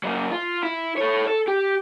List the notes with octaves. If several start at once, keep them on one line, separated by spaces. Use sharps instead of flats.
F#3 A#3
F4
E4
A4 C#5
A4
G4